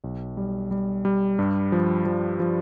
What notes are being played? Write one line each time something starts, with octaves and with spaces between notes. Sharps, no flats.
B1
G3
G3
G3
G2
F3
F3
F3